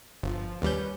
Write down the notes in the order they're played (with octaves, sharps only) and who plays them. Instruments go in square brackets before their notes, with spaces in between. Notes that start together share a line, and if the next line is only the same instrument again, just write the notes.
[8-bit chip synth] G1 [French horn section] F3
[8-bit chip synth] D#2 G3 G6 [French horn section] C#4 B4